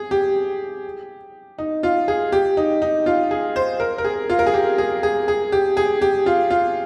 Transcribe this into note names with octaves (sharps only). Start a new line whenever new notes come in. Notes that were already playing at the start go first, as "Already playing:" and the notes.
Already playing: G#4
G4
D#4
F4
G#4
G4
D#4
D#4
F4
G#4
C5
A#4
A#4
G#4
F4
A#4
G#4
G4
G#4
G#4
G#4
G4
G#4
G4
F4
F4